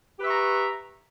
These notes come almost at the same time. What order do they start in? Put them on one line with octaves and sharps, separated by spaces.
G4 B4 E5 C#6 A#5